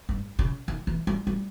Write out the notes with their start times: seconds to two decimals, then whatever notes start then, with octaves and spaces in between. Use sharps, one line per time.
0.09 G2
0.39 C#3
0.68 D#3
0.87 E3
1.07 G3
1.27 G3